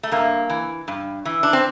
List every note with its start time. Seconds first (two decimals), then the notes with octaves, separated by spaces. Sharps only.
0.03 A3
0.12 G2 A#3
0.50 E3
0.88 G2
1.25 E3
1.43 D4
1.53 C4